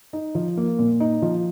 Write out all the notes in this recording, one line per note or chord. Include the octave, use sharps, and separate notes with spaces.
D#4
F3
A#3
A#2
D#4
F3